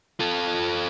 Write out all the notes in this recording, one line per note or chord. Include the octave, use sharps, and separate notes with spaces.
F4 A4